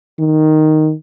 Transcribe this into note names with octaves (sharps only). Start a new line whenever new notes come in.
D#3